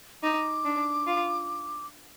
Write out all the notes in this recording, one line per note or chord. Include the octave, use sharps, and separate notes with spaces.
D#4 D6
D4
F4